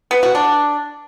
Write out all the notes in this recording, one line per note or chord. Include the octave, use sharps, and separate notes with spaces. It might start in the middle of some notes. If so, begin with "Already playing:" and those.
B3
F#4
D4